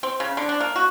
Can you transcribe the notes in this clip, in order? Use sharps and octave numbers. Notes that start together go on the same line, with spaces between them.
C4
C#3
D3
D4
A#3
F#4